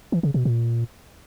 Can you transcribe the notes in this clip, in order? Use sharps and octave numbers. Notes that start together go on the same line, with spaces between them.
E3
C#3
B2
A#2